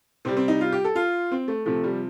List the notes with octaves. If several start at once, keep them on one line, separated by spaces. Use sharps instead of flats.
C3 G3 C4
C4
D#4
F4
G4
A4
F4
C4
A3
C3 F3 A3
G3